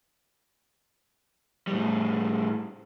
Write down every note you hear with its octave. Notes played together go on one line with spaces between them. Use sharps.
A2 G3